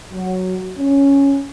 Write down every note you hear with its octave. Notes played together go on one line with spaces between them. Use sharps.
F#3
C#4